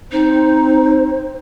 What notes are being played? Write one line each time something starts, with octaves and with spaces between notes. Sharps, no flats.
C4 D#4 C5